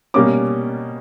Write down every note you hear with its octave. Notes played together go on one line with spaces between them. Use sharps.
B2 G3 A#3 C#4 D6